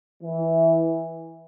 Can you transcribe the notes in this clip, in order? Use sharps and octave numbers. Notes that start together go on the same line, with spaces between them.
E3